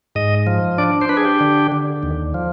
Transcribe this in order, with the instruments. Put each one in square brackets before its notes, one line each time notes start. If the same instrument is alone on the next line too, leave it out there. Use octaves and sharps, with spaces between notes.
[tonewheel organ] G#2 D#5
F3
D4 D5
C5
D4 B4
G#4
G4
D3
D3
D#2
F3